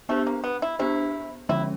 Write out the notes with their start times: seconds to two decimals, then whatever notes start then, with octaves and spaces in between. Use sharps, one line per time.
0.09 A3 B3 D4 G4 C5
0.27 A#3
0.44 B3
0.62 E4
0.79 B3 D4 E4 G4 C5
1.49 D3 F3 G#3 C#4 E4